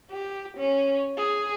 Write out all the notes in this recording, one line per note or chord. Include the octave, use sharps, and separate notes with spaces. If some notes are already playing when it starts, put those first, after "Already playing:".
G4
C#4
G#4